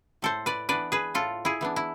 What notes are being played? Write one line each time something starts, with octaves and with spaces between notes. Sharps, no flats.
A2 A4 C5
B4 D5
E3 B3 D4 B4 D5
G#4 B4
A2 F4 A4
E4 G#4
E3 B3 D4
E4